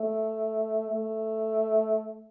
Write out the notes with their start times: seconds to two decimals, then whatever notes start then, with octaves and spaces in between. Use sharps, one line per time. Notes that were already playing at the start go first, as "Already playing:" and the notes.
Already playing: A3
0.92 A3